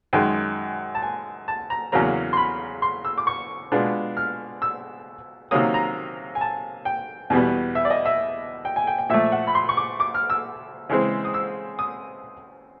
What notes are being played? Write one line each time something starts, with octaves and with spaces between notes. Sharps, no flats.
F#2 D#3 G#3 G5
A5
G#5
A5
A#5
E2 C#3 F#3 A#3 A#5
C6
B5
C6
E6
D6
C#6
B2 G#3 B3 D4 F4
F6
E6
C3 D#3 F#3 A#3 C#4 D#6
A#5
G#5
A5
G5
E2 B2 G3 B3
E5
D5
D#5
E5
G5
G#5
G5
G5
A#2 F3 A3 E5
F#5
B5
C6
C#6
D6
D6
F6
E6
C#3 E3 G#3 C4
D#6
E6
D#6